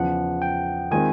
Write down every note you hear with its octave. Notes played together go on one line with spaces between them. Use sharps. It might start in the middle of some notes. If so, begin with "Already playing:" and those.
Already playing: E2 C#3 F3 F#5
G5
D#3 G#3 C4 F4 G#5